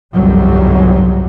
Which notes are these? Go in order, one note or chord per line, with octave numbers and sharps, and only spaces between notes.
G1 C2 F2 G#2 F#3 G3